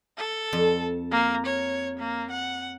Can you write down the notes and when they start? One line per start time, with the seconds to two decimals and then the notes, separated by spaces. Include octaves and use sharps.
0.18 A4
0.53 F2
1.11 A#3
1.46 C#5
1.99 A#3
2.31 F#5